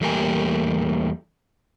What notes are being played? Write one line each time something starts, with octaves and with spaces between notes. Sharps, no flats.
E2 G3 A3 A#3 G4 G#5